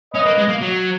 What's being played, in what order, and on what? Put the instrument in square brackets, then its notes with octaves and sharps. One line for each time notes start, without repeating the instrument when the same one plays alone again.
[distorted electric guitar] C#4 [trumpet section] B4 D#5
[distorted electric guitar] A#3
G#3
A#3
F#3